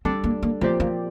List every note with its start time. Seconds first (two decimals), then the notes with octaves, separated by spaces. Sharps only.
0.05 G3 C4 D4 A4 D5
0.24 A#3
0.43 A#3
0.61 A#2 F3 A3 C4 G4 D5
0.80 A#3